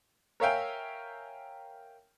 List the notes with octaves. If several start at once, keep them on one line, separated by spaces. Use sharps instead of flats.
A#4 C#5 E5 F5 G5 G#5